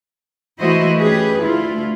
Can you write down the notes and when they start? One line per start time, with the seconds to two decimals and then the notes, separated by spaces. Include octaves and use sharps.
0.59 E3 A3 E4 F#4 C5 D#5
0.99 C#4 G4 G#4 B4
1.43 D2 A3 E4 F4